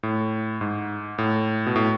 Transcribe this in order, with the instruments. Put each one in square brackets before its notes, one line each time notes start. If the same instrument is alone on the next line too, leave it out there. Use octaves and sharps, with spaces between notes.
[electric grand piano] A2
G#2
A2
B2
A2